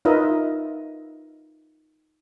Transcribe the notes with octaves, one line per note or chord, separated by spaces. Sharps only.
D#4 F4 A#4 B4 D#5 E5